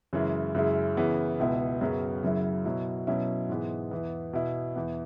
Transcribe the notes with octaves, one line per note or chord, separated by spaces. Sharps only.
F#2 C#3 E3 G#3 E4
F#2 C#3 G#3 E4
C#3 E3 B3 E4
C#2 B2 B3 E4
F#2 C#3 F#3 B3
F#2 C#3 F#3 E4
B2 F#3 E4
B2 F#3 C#4 E4
G#2 E3 G#3 B3
E2 E3 B3
B2 B3 E4
E2 E3 B3